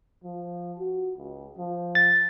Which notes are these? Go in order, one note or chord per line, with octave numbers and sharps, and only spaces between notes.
F3
F#4
C#2
F3
A6